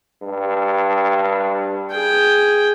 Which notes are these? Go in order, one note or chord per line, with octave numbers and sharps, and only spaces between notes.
G2
G#4 G5